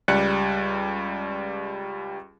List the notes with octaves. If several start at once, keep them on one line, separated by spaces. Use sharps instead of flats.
C#2 G3 D5 F#6 C#7